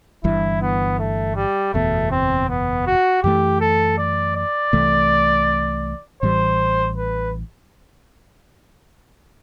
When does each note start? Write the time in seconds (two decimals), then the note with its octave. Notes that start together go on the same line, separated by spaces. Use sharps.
0.24 G1 G2 E3 E4
0.61 B3
0.99 A3
1.36 G3
1.74 F#1 E2 B2 A3
2.11 C4
2.49 B3
2.86 F#4
3.23 F#2 E3 A3 G4
3.60 A4
3.98 D5
4.36 D5
4.73 C2 C3 E3 A3
6.22 A1 A2 E3 G3 C5
6.97 B4